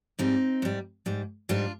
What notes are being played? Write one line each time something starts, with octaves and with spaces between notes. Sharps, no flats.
G#2 G3 C4 D#4
G#2 G3
G#2 G3
G#2 G3 D4 F4